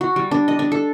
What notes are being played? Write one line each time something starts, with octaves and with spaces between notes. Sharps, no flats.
F#4
G3
D4
D#5
D4
A4